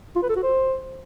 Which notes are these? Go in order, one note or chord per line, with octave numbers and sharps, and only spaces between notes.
F4
B4
A4
F#4
C5